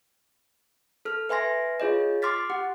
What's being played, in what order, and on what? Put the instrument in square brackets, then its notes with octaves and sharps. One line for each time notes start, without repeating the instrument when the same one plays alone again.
[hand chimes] A4 F6
B4 E5 G#5 C6 A#6
F4 G#4 C#5 D#5
C6 D6 F6 A6 B6
G4 F#5